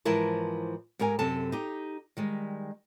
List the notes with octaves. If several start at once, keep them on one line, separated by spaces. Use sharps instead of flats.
G#2 E3 F3 E4 A#4 A5
G#2 G4 A#4 G#5
F#2 C3 A4 A5
D#4 G4
D#3 G3 G#3